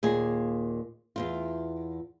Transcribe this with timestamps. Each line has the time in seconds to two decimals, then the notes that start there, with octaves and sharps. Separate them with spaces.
0.03 D#2 A#2 G#4
1.16 E2 G#2 F4